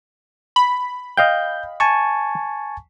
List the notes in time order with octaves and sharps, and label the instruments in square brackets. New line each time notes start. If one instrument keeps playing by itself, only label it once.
[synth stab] B5
[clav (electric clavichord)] D#5 F5 G5 [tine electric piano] G6
[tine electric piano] G#5 A5 C#6